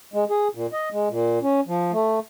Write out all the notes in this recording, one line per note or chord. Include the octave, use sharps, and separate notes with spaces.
G#3
G#4
A#2
D#5
G#3
A#2
C#4
F3
A3